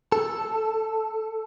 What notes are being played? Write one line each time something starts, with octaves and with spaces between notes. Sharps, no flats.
A4